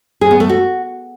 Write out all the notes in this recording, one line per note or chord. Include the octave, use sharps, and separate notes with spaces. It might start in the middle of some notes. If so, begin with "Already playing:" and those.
G#4
B3
A3
F#4